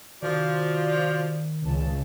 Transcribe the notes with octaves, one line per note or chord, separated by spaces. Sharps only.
C3 D#3 F3 F#4 D5
C#2 A#2 A5